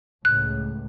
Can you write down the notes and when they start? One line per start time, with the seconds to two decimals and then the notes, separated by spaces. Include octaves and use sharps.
0.25 C#2 A2 F#6